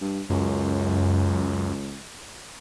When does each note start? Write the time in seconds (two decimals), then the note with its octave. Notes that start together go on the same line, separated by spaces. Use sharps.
0.01 G2
0.30 C#2 F#2